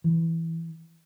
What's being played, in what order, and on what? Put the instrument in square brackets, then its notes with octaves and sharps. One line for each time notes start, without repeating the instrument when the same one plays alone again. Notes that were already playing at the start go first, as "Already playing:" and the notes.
[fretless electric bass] E3